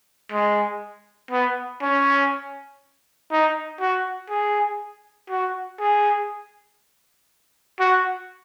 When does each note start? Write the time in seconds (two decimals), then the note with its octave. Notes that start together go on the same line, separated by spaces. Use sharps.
0.32 G#3
1.31 B3
1.82 C#4
3.31 D#4
3.80 F#4
4.30 G#4
5.30 F#4
5.80 G#4
7.80 F#4